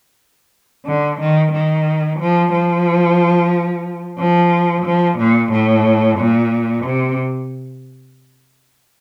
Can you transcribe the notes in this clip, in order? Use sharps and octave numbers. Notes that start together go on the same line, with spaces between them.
D3
D#3
D#3
F3
F3
F3
F3
A#2
A2
A#2
C3